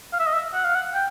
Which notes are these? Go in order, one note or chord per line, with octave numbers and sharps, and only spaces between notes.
F5
E5
D#5
E5
F#5
F5
F#5
G5